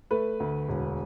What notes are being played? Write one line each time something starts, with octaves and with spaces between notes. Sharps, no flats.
A3 B4
D2
E1